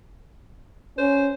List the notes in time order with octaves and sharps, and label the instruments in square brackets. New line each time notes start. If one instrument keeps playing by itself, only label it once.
[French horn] C#4 [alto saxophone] C5